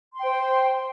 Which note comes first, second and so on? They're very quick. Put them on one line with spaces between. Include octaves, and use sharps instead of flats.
C6 G5 C5